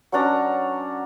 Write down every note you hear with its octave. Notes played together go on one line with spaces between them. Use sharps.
F#3 C#4 D4 A#5